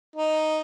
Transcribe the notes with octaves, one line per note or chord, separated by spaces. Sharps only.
D#4